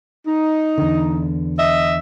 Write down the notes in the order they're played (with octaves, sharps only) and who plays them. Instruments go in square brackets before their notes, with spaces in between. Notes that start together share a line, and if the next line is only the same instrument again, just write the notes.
[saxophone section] D#4
[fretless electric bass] E2 D3
[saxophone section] D#5 E5